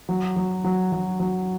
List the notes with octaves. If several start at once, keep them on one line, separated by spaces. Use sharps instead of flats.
F#3
F#3
F#3
F#3
F#3